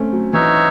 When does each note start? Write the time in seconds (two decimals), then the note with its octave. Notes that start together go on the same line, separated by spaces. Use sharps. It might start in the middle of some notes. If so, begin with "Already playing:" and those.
Already playing: A3 C4 C#4
0.13 F#3
0.33 E3 D#4 F#4 C#5 E5